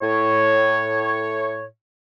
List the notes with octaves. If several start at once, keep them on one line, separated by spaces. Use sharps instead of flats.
A2 C#5